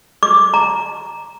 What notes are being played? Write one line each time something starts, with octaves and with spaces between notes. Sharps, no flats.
D6
A#5